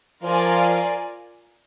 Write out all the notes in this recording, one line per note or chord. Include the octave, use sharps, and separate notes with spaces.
F3 F4 A#4 D5 F5 G#5